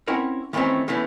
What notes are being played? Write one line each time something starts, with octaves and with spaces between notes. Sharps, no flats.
C4 C#4 E4 A#4 F#5
D#3 E3 G3 A3 C4 C#4
E2 E3 A3 C#4